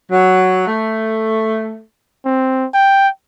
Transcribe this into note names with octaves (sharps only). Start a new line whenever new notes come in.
F#3
A3
C4
G5